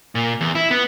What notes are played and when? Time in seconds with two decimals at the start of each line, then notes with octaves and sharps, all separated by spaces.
0.15 A#2
0.41 E2
0.55 E4
0.71 B3